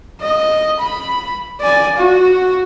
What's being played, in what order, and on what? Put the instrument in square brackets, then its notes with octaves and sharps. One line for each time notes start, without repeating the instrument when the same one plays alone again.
[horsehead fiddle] D#5
B5
D5 G#5
F#4